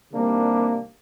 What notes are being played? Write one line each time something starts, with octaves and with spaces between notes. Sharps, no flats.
C3 D#3 G3 A#3 D4